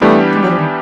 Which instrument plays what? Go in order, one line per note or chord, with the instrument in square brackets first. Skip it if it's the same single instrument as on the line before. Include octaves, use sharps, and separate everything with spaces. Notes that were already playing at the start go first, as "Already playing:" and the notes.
[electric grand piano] E3 G3 B3 D4 G4 [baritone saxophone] A3
[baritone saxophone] G#3
F#3
F3
D#3